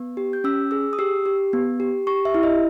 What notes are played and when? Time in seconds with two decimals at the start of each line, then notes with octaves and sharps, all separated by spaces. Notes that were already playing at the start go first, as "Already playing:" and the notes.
Already playing: B3
0.17 G4
0.33 G6
0.44 C#4 E6
0.71 G#4 E6
0.93 D#6
0.99 G4 E6
1.26 G4
1.53 B3
1.80 G4
2.07 G4 C#6
2.25 E5
2.34 E4
2.43 D#5